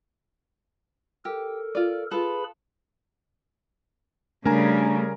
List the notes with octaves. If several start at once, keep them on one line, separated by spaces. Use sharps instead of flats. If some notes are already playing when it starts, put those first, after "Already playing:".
G4 A4 A#4
F4 D5
F4 G#4 A4 B4 B5
C#3 G3 A3 D4 A#4 G#5 A#5